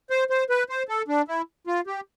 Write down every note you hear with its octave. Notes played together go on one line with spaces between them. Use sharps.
C5
C5
B4
C5
A4
D4
E4
F4
G4